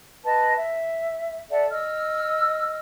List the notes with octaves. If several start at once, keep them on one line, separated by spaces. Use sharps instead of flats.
B4 D#5 A5
E5
A4 D5 E5 F#5
D#5 E6 F6